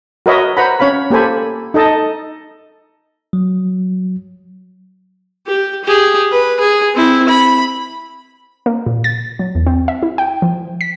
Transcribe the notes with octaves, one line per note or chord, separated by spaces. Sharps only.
F#4 A#4 B4 C#5 D#5 E5
B4 C5 F#5 A#5 B5
C#4 C#5 F5 B5
A#3 G4 A4 C5 G#5 B5
D#4 A4 D#5 A5
F#3
G4
G4 G#4
B4
G#4
C4 E4
B5
A#3
A#2
A6
F#3
E2
C4
E5
E4
G5
F3
B6